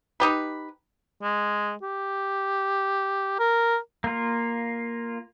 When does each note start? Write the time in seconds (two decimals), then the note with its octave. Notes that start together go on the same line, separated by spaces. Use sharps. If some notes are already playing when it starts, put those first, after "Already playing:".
0.20 D#4 G4 B4
1.23 G#3
1.82 G4
3.39 A#4
4.04 A#3 F4